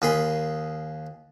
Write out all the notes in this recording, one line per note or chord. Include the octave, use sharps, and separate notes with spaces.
D#2 G#4 B5 C6